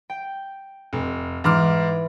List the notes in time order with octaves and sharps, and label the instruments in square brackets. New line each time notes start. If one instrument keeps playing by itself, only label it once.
[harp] G5
[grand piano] F1
[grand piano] G#2 D6 F6 [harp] E3